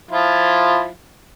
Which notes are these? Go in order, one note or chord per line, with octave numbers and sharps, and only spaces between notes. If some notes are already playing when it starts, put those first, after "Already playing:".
F3 E4 F4